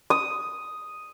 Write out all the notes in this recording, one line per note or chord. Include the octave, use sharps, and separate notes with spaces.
D#6